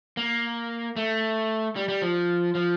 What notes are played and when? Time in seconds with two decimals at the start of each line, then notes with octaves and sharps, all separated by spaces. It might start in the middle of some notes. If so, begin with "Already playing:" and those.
0.17 A#3
0.96 A3
1.76 G3
1.88 G3
2.02 F3
2.55 F3